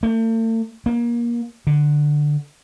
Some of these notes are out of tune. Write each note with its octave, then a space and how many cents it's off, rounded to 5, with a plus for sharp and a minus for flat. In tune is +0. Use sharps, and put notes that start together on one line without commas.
A3 +40
A#3 +25
D3 +10